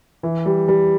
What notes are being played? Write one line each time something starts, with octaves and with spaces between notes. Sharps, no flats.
E3
G3
G3